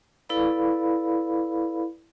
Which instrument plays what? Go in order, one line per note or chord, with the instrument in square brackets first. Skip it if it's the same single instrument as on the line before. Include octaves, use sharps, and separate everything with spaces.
[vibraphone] E4 A4 B4 D5 F5 B5